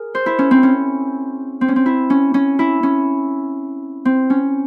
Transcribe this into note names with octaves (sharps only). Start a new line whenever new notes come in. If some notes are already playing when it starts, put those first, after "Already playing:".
Already playing: G#4 A#4
C5
E4
C#4
C4
C#4
C4
C#4
C4
E4
C#4
C#4
E4
C#4
C4
C#4